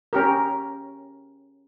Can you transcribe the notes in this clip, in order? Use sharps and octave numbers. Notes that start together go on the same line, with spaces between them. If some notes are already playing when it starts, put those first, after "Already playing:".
C#4 G4 A#4